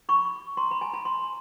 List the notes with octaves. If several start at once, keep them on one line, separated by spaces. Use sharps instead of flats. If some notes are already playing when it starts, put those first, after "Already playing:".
B5 C#6
A#5 C6
B5
G#5 A#5
A5 B5
A#5 C6